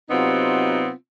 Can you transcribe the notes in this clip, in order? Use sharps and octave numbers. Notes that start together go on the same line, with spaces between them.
C3 F#3 B3 C4 D#4 F4